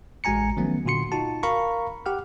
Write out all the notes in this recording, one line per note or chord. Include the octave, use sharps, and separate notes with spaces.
A1 G#3 F#4 G#5 A#5 C#7
D#3 F3 F#3 A3 B3 C#4
A#2 D3 F#4 C6 C#7
D#4 F4 F#4 A5
A#4 F5 A#5 B5 C#6
G4 F#5 F6